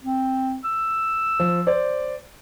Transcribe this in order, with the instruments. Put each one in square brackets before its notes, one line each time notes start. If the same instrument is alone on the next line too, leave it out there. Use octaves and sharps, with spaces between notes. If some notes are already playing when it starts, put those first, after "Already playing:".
[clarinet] C4
E6
[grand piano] F3
C5 D5